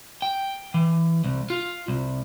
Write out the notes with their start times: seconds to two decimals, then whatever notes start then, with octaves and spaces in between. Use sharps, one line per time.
0.22 G5
0.74 E3
1.24 C2
1.50 F4
1.88 C2